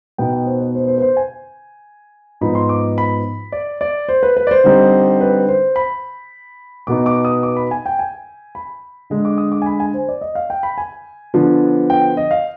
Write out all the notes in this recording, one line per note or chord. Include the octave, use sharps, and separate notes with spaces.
B2 B3 D#4 G5
G5
C5
B4
C5
C5
B4
C5
G#5
G#2 F3 B3 D#4 B5
C6
D6
B5
D5
D5
C5
B4
B4
D5
C5
D3 G3 C4 D#4
B4
C5
B5
B2 B3 D#4 D6
D6
D#6
D6
B5
G#5
G5
G#5
B5
D3 G#3 D4
D6
D#6
D6
G#5
B5
G#5
C5
D5
D#5
F5
G5
B5
G#5
D3 F3 B3 D4
G5
D#5
F5